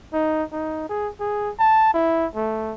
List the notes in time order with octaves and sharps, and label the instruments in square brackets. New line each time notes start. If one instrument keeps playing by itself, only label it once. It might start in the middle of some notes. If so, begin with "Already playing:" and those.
[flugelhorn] D#4
D#4
G#4
G#4
A5
E4
A3